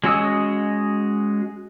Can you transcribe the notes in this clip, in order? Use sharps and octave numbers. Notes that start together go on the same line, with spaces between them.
G#3 C#4 F#4 D#5 E6